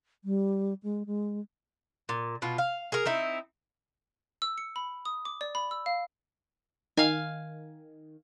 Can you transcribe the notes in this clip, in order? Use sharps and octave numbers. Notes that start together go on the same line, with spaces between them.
G3
G#3
G#3
A#2
B2 F4
F5
G#4 A#4
C4 D#4 E4
E6
C#7
B5
D#6
D6
D5
B5
E6
F5
D#3 F5 G#5